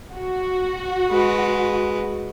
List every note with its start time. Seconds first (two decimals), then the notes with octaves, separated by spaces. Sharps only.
0.14 F#4
1.11 G#3 B4